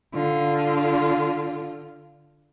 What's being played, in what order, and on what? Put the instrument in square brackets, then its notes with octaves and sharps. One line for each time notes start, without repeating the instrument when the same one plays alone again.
[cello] D3 F4